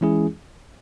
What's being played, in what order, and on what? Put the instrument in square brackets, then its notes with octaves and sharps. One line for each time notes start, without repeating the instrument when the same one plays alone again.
[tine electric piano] E3 G#3 C#4 E4 G#4